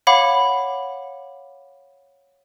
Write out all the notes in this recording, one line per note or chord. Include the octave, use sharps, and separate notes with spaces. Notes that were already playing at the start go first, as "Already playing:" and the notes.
C#5 F5 F#5 B5 D6